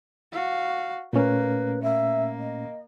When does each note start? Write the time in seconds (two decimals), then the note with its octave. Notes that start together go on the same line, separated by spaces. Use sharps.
0.32 F#4 F5
1.13 A#2 A3 A#3 C#4 B4
1.82 A#3 E5
2.39 D#5